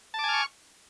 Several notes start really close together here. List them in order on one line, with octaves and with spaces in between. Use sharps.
A5 D6 G#5 F6 C#6